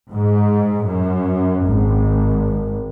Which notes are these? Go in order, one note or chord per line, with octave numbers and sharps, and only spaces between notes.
G#2
F#2
G#1